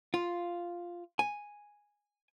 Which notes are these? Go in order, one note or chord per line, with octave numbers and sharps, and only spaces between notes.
F4
G#5